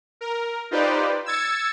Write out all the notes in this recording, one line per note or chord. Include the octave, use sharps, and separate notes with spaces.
A#4
D#4 F4 G4 B4 C5 D5
E6 G#6 A6 C#7